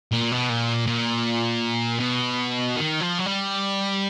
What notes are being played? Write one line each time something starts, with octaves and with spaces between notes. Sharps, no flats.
A#2
B2
A#2
A#2
B2
D#3
F3
F#3
G3